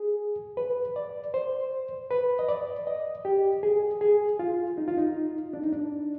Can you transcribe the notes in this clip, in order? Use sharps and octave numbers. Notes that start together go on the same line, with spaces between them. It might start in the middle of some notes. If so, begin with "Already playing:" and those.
Already playing: G#4
B4
D5
C5
B4
D#5
D5
D#5
G4
G#4
G#4
F4
D#4
F4
D#4
D4
D#4
D4